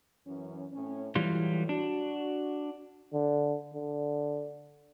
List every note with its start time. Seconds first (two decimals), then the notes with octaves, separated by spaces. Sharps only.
0.26 F#2 E3 C#4
0.72 A2 C4 C#4
1.15 A2 E3 F#3 G3 F4
1.69 D4 F#4
3.13 D3
3.74 D3